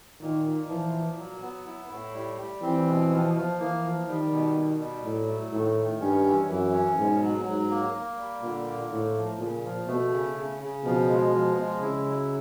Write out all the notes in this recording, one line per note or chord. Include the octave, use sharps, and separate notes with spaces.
A#2 D#3
A#2
E3 F3
A#2
F#3
B3
E4
A2
G3
G3
E3 C4
B2
F3
F3
E3 A#3
F3
D#3 G3
B2
B2
G3
A2 F#3
A3
A2 D#3
D#3
G2 C#4
E3
F#2 E3
C#4
G#2 B2
F#3
G#2 F#3
A#3
A#3
G3
A#2 D3
A#3
A2 A3
F3
A#2 C#3
F3
B2 A3
C#3
C#3
C#3
B2 F3
G#3
F3
G#3
C#3 E4
F#3